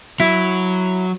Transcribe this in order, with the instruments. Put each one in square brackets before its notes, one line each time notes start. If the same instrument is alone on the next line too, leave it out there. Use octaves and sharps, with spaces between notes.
[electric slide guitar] F#3 [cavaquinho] E4